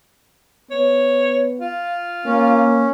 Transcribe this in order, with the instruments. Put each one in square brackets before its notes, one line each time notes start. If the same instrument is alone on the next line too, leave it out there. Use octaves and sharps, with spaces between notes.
[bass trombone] B3 [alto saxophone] C#5
[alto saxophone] F4
[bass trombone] A#3 [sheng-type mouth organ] C#4